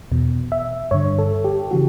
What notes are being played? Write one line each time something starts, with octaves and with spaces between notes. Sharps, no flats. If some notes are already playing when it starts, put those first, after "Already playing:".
E2 B2
E5
G2 D3 C#5
A4
G4
C#3 E3 F#4